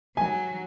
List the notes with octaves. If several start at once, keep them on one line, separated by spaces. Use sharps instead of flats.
F#3 G#5